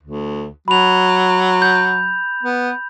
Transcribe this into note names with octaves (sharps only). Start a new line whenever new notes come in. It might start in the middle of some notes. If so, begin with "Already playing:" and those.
D2
F#3 B5 F7
G6
B3